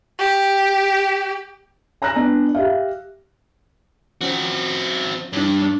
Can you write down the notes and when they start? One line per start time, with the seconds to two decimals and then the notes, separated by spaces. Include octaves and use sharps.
0.19 G4
2.02 G#5 A#5 E6 F#6 A#6
2.16 B3 D4
2.55 G4 E5 F5
4.21 F3 C4 C#4 F#4
5.33 G2 D4